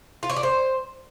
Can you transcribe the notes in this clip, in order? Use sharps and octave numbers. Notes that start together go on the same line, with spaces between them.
F4
C#5
D4
C5